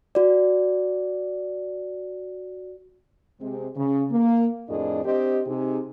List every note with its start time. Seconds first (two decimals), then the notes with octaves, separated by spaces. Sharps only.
0.15 F#4 D5
3.41 C3 G#3 C4
3.76 C#3
4.11 A#3
4.69 F2 A2 D4 G#4 A#4 D#5
5.05 C4 D4 G4 D#5
5.46 C3 D#4 G#4